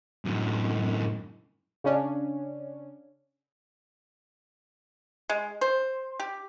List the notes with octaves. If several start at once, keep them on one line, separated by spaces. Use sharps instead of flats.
F#2 A2
C#3 C#4 D4
G#3
C5
G4